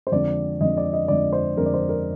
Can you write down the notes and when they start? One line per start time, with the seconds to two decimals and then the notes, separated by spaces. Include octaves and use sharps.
0.07 C5
0.12 F2 D3 G#3 C4 D5
0.61 F2 D3 G#3 C4 D#5
0.77 D5
0.93 D#5
1.08 F2 D3 G#3 C4 D5
1.33 C5
1.57 F2 D3 G#3 C4 A#4
1.66 D5
1.74 C5
1.89 A#4